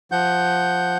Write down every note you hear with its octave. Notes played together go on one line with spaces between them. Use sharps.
F3 F#5 G6